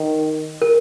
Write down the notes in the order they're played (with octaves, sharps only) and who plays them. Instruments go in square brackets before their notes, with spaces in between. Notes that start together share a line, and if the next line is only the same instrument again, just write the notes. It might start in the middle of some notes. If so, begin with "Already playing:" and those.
Already playing: [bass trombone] D#3
[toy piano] A#4